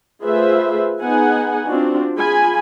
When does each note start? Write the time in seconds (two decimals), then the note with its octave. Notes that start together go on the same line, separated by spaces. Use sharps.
0.23 A3 F4 G#4 B4 C5 E5
1.01 B3 D#4 G#4 F#5 G#5
1.66 C4 D4 F4 F#4
2.18 F4 G#4 G#5 B5